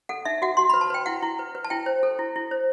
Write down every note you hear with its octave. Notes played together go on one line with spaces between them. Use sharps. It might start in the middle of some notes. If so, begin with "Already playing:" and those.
A4 F#5
D#4 E5
F#4 F#5
F#4 C6
B4 B5
A5
B4 G5
E4 F#5
E4
B4
B4
A5
E4 G5
C5
A4
E4
E4
C5